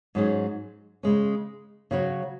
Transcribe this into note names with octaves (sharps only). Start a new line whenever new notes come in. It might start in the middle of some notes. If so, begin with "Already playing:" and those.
G#2 F#3 C#4 G#4
C#3 G#3 C#4
C#3 F#3 C#4 F#4 C#5